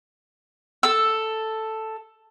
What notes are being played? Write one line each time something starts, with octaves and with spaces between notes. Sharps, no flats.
A4 E6